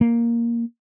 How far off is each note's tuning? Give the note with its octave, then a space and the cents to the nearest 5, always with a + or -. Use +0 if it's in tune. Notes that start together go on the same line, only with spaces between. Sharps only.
A#3 +5